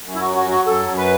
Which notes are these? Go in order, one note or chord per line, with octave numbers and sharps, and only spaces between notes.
F#2
E4
F#3 F#4
F#4
F#3 F#4
F#2 A4
F#2
B4